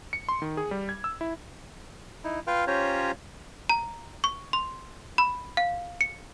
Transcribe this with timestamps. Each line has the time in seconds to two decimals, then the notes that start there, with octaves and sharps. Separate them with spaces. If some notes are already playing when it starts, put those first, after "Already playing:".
0.13 C#7
0.29 C6
0.42 D#3
0.57 G#4
0.71 G3
0.89 G#6
1.04 E6
1.21 E4
2.24 D#4 E4
2.47 F4 B4 F5 G5 C6 F6
2.67 C#4 F4 G4 C5 C#5 A#5
3.69 A#5
4.24 C#6
4.53 C6
5.18 B5
5.57 F5
6.01 C#7